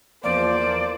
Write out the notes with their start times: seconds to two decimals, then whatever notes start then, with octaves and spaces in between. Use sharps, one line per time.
0.24 E2 F3 A#3 C5 D5